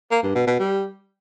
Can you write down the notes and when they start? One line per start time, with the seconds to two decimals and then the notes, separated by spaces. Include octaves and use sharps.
0.11 A#3
0.23 G2
0.35 B2
0.47 B2
0.59 G3